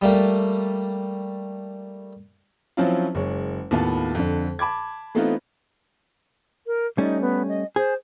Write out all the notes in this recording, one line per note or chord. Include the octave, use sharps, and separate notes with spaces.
G3 A3 A#3
F3 F#3 C4 C#4 E4 F4
F#1 G#3 C#5
D#2 A2 B3 F4 F5 A5
F2 D3
A5 B5 D6 G#6
E3 A3 B3 C4 D#4 F4
A#4
G3 A3 C#4 D#4
B3
D#5
G#4 C5